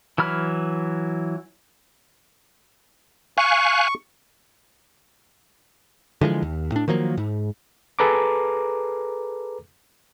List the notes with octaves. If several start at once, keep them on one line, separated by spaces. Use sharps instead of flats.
E3 F#3 B5 F6
F5 G#5 C#6 F#6
D3 E3 F3 G#3
D#2
A2 D4
D#3 F3 F#3 A#3
G#2
G#4 A4 B4 A#5 D6